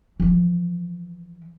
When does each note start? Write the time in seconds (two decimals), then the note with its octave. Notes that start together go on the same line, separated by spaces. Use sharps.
0.20 E3 F3